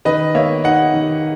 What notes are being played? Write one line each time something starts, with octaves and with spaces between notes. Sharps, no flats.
D#3 B4 D#5
A#3 C#5 E5
D#4 D#5 F#5
D#3